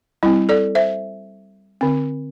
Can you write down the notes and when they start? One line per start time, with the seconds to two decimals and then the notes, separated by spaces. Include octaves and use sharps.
0.23 G3 C4 E4
0.49 A4 D5
0.75 C5 E5
1.81 D3 C4